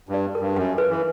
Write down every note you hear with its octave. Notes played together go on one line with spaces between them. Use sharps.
G2
D5
A#4
G2
F#2 F#5
B4
E3